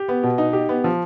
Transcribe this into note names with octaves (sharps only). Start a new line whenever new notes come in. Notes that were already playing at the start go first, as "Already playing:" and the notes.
Already playing: G4
B3
B2
D#4
G4
B3
F3